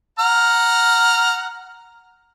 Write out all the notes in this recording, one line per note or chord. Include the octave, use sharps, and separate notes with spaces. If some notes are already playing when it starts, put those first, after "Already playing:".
F#5 A#5 F6